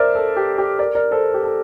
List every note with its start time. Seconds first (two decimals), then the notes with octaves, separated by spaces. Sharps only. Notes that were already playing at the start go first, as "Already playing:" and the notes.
Already playing: A#4 C5 D5 E5
0.15 A4
0.36 G4
0.58 G4
0.79 A#4 D5
0.95 A#4 D5
1.11 A4 C5
1.34 G4
1.43 A4